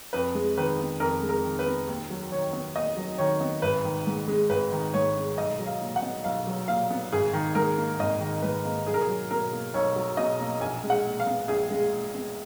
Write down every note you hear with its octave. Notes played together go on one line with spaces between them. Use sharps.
F2 B4
G#3
D#3 B4
B3
F2 A#4
G#3
A#4
D#3
B4
B3
D#2
F#3
D#3 C#5
B3
D#2 D#5
F#3
D#3 C#5
B3
G#1 B4
D#3
G#2
G#3
G#1 B4
D#3
G#2 C#5
G#3
B1 D#5
F#3
F5
A#2
F#5
B3
B1 F5
F#3
A#2 F5
B3
G#1 G#4
D#3
G#2 A#4
A#3
G#1 D#5
D#3
G#2 B4
A#3
B1 G#4
A#4
G#4
F#3
B2 A#4
A#3
B1 C#5
F#3
B2 D#5
A#3
A#1 G#5
G#3
F#5
A#2
F5
B3
A#1 G#4
G#3
A#2
B3